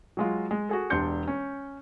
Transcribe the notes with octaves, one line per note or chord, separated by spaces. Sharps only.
F#3 G#3 F4
G#3
F#4 G#4 A4
E1 D4 G4 C6 G6 C#7
C#4